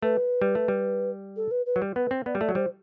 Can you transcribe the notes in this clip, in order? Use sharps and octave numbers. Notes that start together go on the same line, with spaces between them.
A3 B4
G3
A3
G3
A4
B4
B4
F#3
G3
B3 B4
C4
B3 D5
G3
A3 D5
F#3
G3 C5